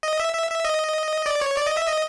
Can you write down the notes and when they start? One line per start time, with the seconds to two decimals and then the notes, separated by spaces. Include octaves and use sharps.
0.03 D#5
0.20 E5
0.34 E5
0.50 E5
0.65 D#5
1.26 D5
1.41 C#5
1.57 D5
1.67 D#5
1.77 E5
1.88 D#5